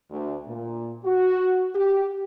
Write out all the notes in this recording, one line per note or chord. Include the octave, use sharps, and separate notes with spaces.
D2
A#2
F#4
G4